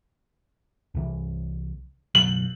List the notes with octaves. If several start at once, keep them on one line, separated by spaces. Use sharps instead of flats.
C2 C3 E3
F#1 B2 F#3 F#7